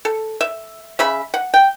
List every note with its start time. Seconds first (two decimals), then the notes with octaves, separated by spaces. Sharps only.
0.05 A4
0.41 E5
0.99 C#3 E5 B5
1.34 F#5
1.54 G5